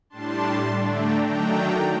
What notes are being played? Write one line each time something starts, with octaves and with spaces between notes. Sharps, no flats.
A2 G3 D4 A5 C6
D3 A3 D4
G5 A#5
D#3 F#3 A3 D4 G5 A#5